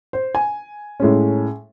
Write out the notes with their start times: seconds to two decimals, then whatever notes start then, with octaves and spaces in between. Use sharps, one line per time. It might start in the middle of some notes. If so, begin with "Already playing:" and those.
0.13 C5
0.35 G#5
1.00 A2 G#3 C#4